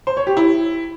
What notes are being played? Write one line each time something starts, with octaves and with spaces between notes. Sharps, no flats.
C5
C#5
G4
E4